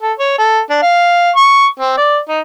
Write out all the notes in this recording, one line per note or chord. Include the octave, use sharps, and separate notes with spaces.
A4
C#5
A4
D4
F5
C#6
C4
D5
D#4